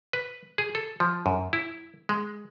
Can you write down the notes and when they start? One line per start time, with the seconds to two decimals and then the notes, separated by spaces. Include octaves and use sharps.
0.13 B4
0.58 G#4
0.75 A4
1.00 F3
1.26 F#2
1.53 E4
2.09 G#3